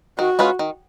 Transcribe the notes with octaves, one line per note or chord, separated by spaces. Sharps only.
D#3 F#4
G#3 C#4 F4 B4
D#3